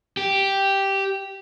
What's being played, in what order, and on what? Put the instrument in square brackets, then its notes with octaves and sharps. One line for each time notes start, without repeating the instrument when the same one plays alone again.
[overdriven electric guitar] G4